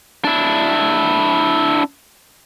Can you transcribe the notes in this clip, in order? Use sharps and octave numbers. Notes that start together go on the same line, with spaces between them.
D4 E4